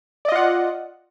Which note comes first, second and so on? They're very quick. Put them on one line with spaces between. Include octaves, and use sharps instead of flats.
D5 D#5 F4 F#5